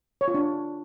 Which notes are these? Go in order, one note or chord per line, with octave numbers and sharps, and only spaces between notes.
C#5
F4
D4